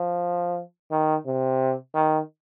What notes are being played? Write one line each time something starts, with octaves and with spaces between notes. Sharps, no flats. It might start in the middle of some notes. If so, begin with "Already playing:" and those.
Already playing: F3
D#3
C3
D#3